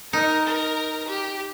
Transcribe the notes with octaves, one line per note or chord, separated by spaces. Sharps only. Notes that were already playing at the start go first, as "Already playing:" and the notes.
D#4 A#4
A#4
G4